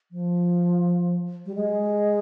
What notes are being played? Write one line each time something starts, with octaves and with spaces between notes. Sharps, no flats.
F3
G3
G#3